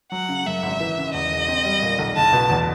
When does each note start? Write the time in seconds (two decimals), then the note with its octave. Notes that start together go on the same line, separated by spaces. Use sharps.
0.12 F#3 F#5
0.29 C#3
0.46 F#2 E5
0.63 G#1
0.80 E3
0.97 C#3
1.14 E2 D#5
1.31 E1
1.48 C4
1.65 G3
1.82 A#2
1.99 B1
2.16 F#1 A5
2.33 B2
2.50 E2